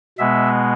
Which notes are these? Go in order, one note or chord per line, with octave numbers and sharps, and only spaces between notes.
B2 G#3 B3 E5